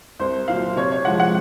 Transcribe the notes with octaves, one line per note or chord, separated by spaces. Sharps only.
C2 C5
A#2 F#3 F5
C3 C#5
C#5
F3 G#3 F#5
F#5